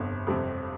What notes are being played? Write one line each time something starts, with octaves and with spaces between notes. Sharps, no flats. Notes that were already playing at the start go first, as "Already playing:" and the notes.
Already playing: G1 F2 C3 C4
F2 C3 G3 C4